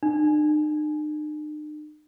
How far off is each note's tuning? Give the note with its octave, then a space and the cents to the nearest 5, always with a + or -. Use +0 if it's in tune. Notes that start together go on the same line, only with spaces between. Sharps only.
D#4 -45